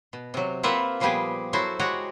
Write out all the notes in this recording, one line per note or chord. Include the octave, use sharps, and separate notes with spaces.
B2
C3 F#3
A#3 C4 F4 B4 E5 F#5
A#2 F3 G3 B3 G4 G#4
F#3 E4 F#4 A4 C5
G#3 F#4 G4 C#5 F#5 A#5